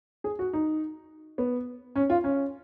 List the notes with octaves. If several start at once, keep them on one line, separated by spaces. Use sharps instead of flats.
G#4
F#4
D#4
B3
C#4
F4
C#4